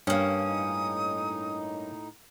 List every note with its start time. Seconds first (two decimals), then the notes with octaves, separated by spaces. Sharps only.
0.07 G2 A#3 C#4 D#6
0.47 A2 D#4